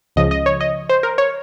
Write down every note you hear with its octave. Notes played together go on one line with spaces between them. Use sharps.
C#2 C#3 F3 D#5
D#5
C#5
D#5
C5
A#4
C#5